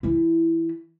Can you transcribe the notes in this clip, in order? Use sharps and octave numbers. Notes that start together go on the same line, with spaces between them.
E3 E4